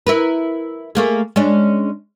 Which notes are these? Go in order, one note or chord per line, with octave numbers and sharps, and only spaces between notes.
E4 A#4 B4
A3 A#3 G#4
G#3 C#4 D4